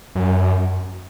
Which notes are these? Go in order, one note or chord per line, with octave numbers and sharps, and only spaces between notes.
F#2